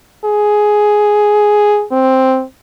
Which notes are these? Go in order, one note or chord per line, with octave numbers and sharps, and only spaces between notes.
G#4
C4